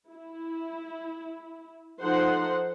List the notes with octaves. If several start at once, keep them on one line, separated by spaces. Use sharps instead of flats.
E4
F3 D#4 A4 C5 F#5 C6